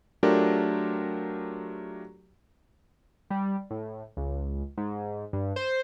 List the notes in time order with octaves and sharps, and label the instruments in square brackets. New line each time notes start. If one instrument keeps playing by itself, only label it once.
[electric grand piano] F#3 A3 D4 F4 G4 A#4
[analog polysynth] G3
A2
C#2
G#2
G2
C5